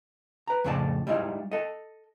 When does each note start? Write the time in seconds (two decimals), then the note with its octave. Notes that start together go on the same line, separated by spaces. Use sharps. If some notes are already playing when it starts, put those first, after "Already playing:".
0.47 B4 A#5
0.64 F2 A2 C#3 C4 D5 A5
1.07 G3 G#3 D#4 E4 F5
1.51 A4 D#5